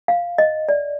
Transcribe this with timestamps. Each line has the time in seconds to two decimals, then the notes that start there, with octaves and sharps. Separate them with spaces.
0.08 F5
0.38 D#5
0.69 D5